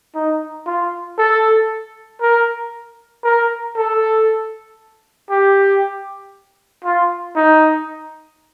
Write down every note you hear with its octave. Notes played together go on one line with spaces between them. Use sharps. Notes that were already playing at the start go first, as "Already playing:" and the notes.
D#4
F4
A4
A#4
A#4
A4
G4
F4
D#4